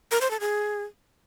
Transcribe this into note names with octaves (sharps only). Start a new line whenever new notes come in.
A#4
C5
A4
G#4